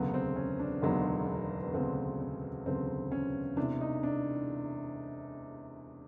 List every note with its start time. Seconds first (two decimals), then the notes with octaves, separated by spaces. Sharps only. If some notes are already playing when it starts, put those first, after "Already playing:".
Already playing: E1 D2 C#3 F#3 B3
0.14 C4
0.36 C#4
0.59 D4
0.82 E1 D2 C#3 F#3 B3 D#4
1.28 D4
1.64 B3
1.74 E1 D2 C#3 F#3 B3 C4
2.20 C4
2.66 E1 D2 C#3 F#3 B3 C4
3.12 C#4
3.57 E1 E2 C3 D4
3.81 D#4
4.03 D4